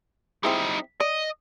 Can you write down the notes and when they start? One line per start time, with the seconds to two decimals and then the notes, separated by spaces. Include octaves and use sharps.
0.43 G3 C4 D#4 E4 G#4
1.00 D5 D#5